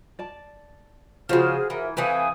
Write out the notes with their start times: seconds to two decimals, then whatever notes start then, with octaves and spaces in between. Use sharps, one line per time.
0.19 D5 A5
1.29 C#3 F3 F4 F#4 G#4 C5 F6
1.70 E3 A#4 E5
1.97 E3 A3 C4 B4 F5 G#5 D#6